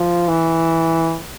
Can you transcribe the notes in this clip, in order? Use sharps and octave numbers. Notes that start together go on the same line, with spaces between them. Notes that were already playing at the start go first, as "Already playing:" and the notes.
Already playing: F3
E3